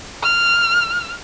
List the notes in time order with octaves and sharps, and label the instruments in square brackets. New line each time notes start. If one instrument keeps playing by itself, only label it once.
[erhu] F6